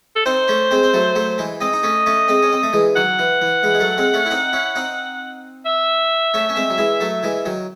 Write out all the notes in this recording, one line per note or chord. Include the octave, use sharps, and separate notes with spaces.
A4
C4 D#4 C5
A3 C#4
G#3 C4
C4
F#3 A3
F#3 A3
E3 G#3
G#3 C4 D#5
D#4
A3 C#4
A3 C#4
G#3 C4
C#4
C4
A3
E3 G#3
D#3 F#3 F#5
E3
E3
E3 G#3
G#3
F#3 A3
G#3 C4
A3 C#4
E4
C4 D#4
C#4 E4
C4 D#4
E5
A3 C#4
C#4
G#3 C4
F#3
E3 G#3
F#3 A3
E3 G#3
D#3 F#3